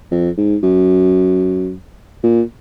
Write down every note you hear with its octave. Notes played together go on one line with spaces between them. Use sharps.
F2
G#2
F#2
A#2